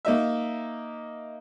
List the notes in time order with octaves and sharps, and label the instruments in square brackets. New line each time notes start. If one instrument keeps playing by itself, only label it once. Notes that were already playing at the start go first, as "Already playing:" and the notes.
[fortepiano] A#3 D#4 E5